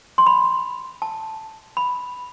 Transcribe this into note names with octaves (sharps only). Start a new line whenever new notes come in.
C6
B5
A5
B5